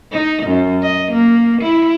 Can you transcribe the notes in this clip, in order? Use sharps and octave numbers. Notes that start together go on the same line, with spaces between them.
D#4
F#2
D#5
A#3
E4